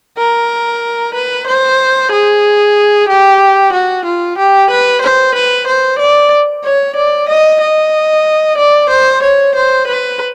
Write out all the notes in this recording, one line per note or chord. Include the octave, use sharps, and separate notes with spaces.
A#4
B4
C5
G#4
G4
F#4
F4
G4
B4
C5
B4
C5
D5
C#5
D5
D#5
D#5
D5
C5
C#5
C5
B4